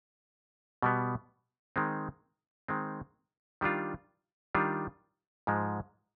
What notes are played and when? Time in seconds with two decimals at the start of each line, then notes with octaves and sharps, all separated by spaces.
0.82 B2 G3 B3
1.76 D#3 G#3 C4
2.68 D#3 G#3 C4
3.61 D#3 G3 D4 F4
4.55 D#3 G3 D4 F4
5.47 G#2 F3 G#3